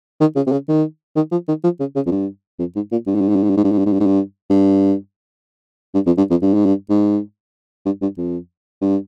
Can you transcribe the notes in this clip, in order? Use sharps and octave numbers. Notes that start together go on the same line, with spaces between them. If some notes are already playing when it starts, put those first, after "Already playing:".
D#3
C#3
C3
C#3
D#3
D#3
F3
D#3
F3
C#3
C#3
F2
G2
F2
G#2
A#2
G2
G#2
G2
G#2
G2
G#2
G2
G#2
G2
G#2
G2
G#2
G2
G#2
G2
G2
G2
F2
G2
F2
G2
G#2
G2
G#2
G2
G2
F2
G2